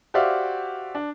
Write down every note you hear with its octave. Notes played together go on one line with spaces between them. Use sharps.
F#4 G4 C5 D5 E5 F5
D4